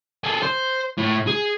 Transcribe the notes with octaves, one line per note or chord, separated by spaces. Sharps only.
G#4 A4
C5
A2
G#4